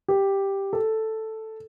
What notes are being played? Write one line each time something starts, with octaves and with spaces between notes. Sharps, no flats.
G4
A4